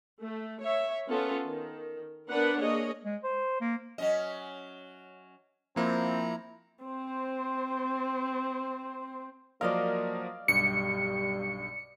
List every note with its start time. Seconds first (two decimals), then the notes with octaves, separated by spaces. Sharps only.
0.23 A3
0.64 C#5 E5
1.09 B3 C#4 F4 A4
1.45 D#3
2.30 B3 D4 A#4 B4 F#5
2.61 A#3 G#4 C#5 D#5
3.05 G#3
3.24 C5
3.61 A#3
3.98 F#3 C#4 D#5
5.76 F3 A#3 C4 E4 A#5
6.84 C4 C5
9.61 F3 F#3 A#3 A#4 D5 D#5 F5
10.48 B1 G2 G3 C#7